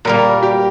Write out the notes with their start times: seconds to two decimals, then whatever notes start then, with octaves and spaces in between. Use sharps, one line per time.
0.05 A#2 G3 A#3 A#4
0.43 G4